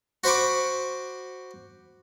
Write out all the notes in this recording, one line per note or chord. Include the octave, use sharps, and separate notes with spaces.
F#4 C5 B5 C#6 D6